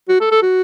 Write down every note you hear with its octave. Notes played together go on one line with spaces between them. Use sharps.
F#4
A4
A4
F#4